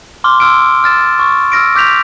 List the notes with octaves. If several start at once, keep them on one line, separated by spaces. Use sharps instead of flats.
C6 D6 F6 G7
C6 E6 F6 D7
F6 A6 E7
C#6
E6 F6 A#6 D7
D6 G6 B6 F7